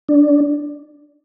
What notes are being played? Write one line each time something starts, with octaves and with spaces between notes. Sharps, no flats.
D4